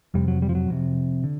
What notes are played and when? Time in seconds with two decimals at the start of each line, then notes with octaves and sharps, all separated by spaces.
0.14 F1 F2 C3 G3
0.28 F#3
0.42 G3
0.49 F3
0.55 F#3
0.68 F1 F2 C3
1.24 D3